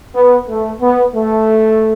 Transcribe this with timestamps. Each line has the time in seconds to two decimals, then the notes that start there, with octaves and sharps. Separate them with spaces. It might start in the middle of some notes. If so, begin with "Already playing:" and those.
0.14 B3
0.48 A3
0.81 B3
1.15 A3